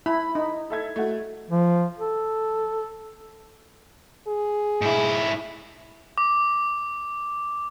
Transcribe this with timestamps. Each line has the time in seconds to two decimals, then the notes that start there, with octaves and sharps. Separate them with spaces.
0.06 E4 B5
0.35 D#4
0.70 A4 E5 G#6
0.96 A3 F#4
1.51 F3
1.99 A4
4.28 G#4
4.82 G#2 E4
6.18 D6